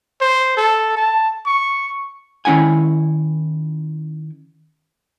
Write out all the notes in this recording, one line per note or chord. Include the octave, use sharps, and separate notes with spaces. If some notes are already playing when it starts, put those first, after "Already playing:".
C5
A4
A5
C#6
D#3 C#4 E4 F#5 G#5